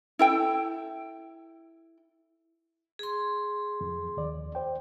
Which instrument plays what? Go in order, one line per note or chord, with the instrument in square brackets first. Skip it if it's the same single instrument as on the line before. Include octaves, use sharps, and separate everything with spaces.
[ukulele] E4 A4 G5
[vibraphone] G#4 C6
[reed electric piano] F2
D#2 D5
C5 G5